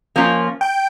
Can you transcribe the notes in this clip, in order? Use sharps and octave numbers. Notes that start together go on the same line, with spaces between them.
F3 A#3 C#4 F4
G5